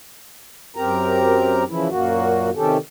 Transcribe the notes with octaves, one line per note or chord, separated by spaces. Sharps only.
F#2 C4 G4 A#4 A#5
C#3 E3 F3 E4
F#2 A#2 A#3 F#4
C3 D#3 C#4 G4 A4